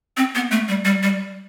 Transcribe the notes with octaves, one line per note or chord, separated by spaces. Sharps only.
C4
B3
A3
G3
G3
G3